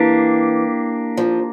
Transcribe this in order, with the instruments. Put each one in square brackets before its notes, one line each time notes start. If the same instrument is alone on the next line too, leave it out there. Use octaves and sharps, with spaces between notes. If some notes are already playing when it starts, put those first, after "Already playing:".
Already playing: [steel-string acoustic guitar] E3 [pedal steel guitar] A#3 D4 G4
[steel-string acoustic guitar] F3